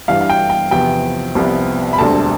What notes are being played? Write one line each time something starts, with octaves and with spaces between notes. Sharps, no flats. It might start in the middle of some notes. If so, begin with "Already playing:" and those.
G2 E3 G3 F5
F5
G5
G5
E2 C3 F3 B3 G5
C2 C3 F3 B3
B5
E1 D2 D3 G3 C4 A5